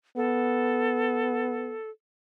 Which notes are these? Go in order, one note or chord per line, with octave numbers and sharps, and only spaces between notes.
B3 A4